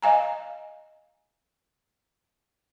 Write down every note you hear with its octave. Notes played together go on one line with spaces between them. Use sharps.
D#5 F5 G#5 A#5